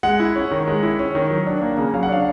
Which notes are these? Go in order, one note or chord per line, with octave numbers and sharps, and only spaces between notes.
G#3 F#5
E4
C#4
D#3
G#3
E4
C#4
D#3
F#3
D4
A#3
C#3
F#3 F5
F#5
D4 F5